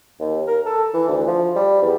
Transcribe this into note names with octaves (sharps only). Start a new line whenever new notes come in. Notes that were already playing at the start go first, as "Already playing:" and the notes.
D#2
A#4
A4
E3
D2
F3
G3
E2